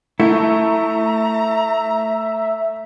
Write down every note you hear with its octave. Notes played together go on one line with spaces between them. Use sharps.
A3 E4 E5 A#5